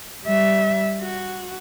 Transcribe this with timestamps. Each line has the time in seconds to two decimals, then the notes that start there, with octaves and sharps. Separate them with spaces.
0.24 G3 E5
1.01 F#4